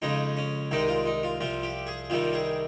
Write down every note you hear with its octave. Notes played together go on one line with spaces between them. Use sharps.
F2 C#3 G#3 D#4
C#4
C2 C3 D#3 G#3 D#4
F4
D#4
F4
C2 C3 F3 F4
G4
G#4
C2 C3 D#3 G3 F4
G#4